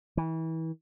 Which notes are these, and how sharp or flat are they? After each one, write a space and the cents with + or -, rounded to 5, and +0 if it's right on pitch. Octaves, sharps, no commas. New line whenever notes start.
E3 -30